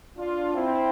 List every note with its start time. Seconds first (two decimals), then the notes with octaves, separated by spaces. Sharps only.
0.17 D4 F4
0.54 C4 E4